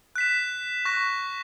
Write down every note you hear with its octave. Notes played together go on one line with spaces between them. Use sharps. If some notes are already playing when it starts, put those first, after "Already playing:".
F#6 B6 E7
C#6 F#6 A#6